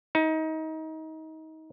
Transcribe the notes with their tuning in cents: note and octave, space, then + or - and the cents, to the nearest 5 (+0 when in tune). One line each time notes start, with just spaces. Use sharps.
D#4 +25